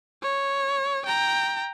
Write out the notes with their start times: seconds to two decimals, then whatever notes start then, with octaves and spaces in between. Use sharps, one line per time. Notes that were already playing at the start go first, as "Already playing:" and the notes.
0.23 C#5
1.06 G5 A#5